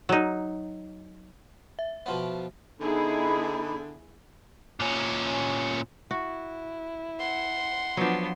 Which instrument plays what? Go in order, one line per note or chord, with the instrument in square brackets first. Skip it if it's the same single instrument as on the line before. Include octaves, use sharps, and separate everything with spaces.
[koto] F#3 D#4
[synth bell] E5
[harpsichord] B2 F3 B3
[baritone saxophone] D3 [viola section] B3 E4 G#4 [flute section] D#4 B5
[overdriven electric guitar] A#2 C#4
[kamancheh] E4 [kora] F#4
[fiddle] F#5 [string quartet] C6
[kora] F3 F#3 [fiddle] B3 D4